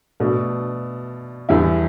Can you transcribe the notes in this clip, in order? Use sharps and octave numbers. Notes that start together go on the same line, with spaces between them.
B2 A3 D4
E2 D3 G3 E4